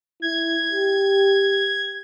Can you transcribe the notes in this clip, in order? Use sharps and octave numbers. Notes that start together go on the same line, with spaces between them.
E4 G#6
G4